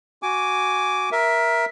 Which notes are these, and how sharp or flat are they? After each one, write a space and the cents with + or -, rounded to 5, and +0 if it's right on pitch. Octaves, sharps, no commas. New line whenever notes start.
F#4 +0 G#5 +0 D6 -10
A#4 +15 E5 +0